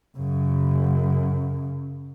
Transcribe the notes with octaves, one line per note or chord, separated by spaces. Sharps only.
F#2 C#3